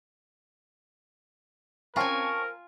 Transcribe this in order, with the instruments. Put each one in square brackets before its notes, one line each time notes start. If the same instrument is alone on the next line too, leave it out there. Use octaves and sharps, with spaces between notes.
[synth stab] C4 C#4 A5 [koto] F4 G#5 [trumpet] A#4 [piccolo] C#6